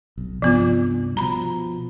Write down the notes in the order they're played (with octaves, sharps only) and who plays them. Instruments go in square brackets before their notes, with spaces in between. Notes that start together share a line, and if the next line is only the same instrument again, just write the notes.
[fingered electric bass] B1
[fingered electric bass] C2 G2 [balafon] F3 B3 F4
[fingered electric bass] B2 F3 [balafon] A#5 B5